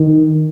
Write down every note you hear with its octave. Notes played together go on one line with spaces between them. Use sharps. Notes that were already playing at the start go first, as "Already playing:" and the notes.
Already playing: D#3